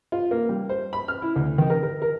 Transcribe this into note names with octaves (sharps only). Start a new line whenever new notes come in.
F4
A#3
G3
C5
B5
F6
E4
D2
D#3
A#4
A#4
A#4